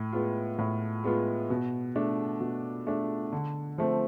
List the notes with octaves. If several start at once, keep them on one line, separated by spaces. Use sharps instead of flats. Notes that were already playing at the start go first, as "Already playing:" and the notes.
Already playing: A2
G#3 B3 F4
A2
G#3 B3 F4
B2
A3 D4
B2
A3 D4
D3
F3 A3 C4